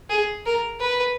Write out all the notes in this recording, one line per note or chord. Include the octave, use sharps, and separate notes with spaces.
G#4
A#4
B4